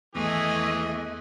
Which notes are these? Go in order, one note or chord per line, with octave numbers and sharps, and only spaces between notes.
G#1 E2 E3 A3 G#4 D#5